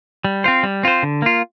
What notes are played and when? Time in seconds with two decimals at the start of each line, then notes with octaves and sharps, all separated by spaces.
0.25 G3
0.44 C4 F4 C5
0.63 G3
0.83 C4 F4 C5
1.03 D3
1.22 A#3 F4